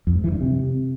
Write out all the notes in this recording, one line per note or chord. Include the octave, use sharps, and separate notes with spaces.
F2
G#2
E3
G2
C3